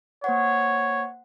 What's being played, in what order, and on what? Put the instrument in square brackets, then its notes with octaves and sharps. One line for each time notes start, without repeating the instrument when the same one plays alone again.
[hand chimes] A#3 C5 F#5 [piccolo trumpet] C#5